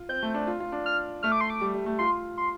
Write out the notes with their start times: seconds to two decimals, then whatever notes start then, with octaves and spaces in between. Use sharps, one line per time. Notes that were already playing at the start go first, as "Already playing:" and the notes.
Already playing: F4
0.09 C4 G6
0.23 A3
0.34 D4
0.47 F4
0.60 F4
0.72 D4
0.86 F6
1.23 A3 F6
1.32 D6
1.41 C6
1.50 D6
1.61 G3
1.74 G3
1.86 A3
1.99 F4 C6
2.38 C6